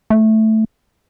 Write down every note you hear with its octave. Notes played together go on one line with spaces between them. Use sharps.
A3